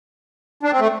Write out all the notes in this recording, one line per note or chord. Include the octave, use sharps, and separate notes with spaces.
D4
C4
A3